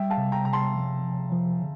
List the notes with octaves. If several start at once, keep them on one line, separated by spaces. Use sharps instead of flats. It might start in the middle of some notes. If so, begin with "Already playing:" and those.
Already playing: G3 E5 G5
F5 A5
C3
G5 A#5
C3 A#5
A5 C6
F3
F3
F3
D3